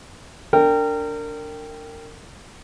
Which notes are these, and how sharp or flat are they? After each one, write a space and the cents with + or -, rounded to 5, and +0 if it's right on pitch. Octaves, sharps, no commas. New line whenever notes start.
D4 -15 A#4 -30 G5 +0